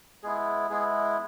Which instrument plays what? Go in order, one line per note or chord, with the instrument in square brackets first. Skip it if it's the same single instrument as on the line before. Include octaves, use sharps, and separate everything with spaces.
[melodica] G#3 B3 E4 G#4
G#3 B3 E4 G#4